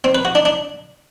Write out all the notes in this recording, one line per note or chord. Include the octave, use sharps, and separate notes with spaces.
C4
B4
F#4
D4
D4